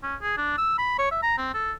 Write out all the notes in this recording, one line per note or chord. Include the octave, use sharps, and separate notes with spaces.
C#4
G#4
D4
E6
B5
C#5
E5
A#5
C4
A4